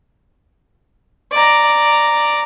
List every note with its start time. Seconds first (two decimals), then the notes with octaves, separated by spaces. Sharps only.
1.32 D5 A#5